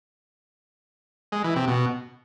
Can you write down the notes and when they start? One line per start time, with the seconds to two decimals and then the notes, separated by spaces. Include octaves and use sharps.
1.32 G#3
1.44 E3
1.56 C3
1.68 B2